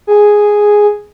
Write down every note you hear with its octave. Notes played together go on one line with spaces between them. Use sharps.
G#4